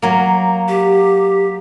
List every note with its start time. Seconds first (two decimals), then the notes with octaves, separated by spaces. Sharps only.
0.02 F#3 A#3
0.68 G4